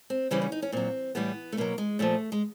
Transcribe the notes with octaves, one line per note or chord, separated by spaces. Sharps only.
C4
C#3 E3 G3 C4
C#4
D#4
C#4
A#2 F#3 C4
A2 E3 G3 B3
A3
B2 F#3 A#3
G#3
A#2 F3 A3
G#3